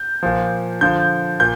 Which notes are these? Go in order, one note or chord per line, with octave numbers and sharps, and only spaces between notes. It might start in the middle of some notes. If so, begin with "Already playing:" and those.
Already playing: G6
A#2 F3
D3 F3 G6
A#2 G6